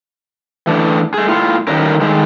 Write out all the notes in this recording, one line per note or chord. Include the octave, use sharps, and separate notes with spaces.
E3 A3 D4
A3 G#4
A2 F4
D#3 F#3 G3 A3 C#4 A#4
D#3 G#3 A3